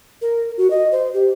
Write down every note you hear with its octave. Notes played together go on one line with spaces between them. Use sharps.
A#4
F#4
D#5
C5
G4